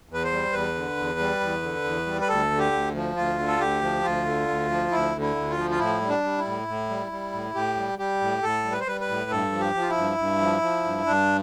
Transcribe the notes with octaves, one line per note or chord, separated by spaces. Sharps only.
E2 B4
C5
G3
E2 B4
D3
E2
G3
E2
D3
E2
G3
B4
D2 A4
D3
G4
D2
F3
D2 F4
D3
A4
D2 G4
F3
D2 F4
D3
D2
F3
D2 E4
D3
E4
D2
F4
F3
F4
A2 E4
G3
D4
G3
E4
A2
A2
G3
G3
A2
A2 G4
G3
G3 G4
A2
A2 A4
G3
B4
C5
G3 B4
B4
A2
G2 A4
F3
G4
F3
F4
E4
G2
G2
F3
F3
G2
G2 D4